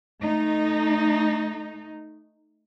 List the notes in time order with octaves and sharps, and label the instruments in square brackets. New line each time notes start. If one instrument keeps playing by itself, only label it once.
[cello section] A3 D#4